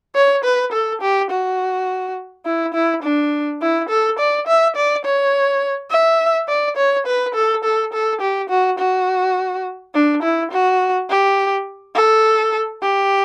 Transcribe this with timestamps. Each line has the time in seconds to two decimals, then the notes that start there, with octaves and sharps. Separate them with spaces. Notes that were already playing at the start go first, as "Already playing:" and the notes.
0.16 C#5
0.44 B4
0.72 A4
1.02 G4
1.31 F#4
2.46 E4
2.74 E4
3.03 D4
3.61 E4
3.89 A4
4.19 D5
4.47 E5
4.76 D5
5.05 C#5
5.91 E5
6.48 D5
6.77 C#5
7.07 B4
7.35 A4
7.64 A4
7.93 A4
8.21 G4
8.50 F#4
8.79 F#4
9.95 D4
10.23 E4
10.52 F#4
11.10 G4
11.95 A4
12.82 G4